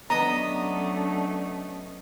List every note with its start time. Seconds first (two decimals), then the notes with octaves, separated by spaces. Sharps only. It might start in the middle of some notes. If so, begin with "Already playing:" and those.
0.10 F#3 A3 B3 C#4 D4 D#5 A#5